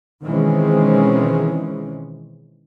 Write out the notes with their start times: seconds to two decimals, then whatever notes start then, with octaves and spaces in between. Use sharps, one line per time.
0.23 B2 D#3 E3 G#3 C4 C#4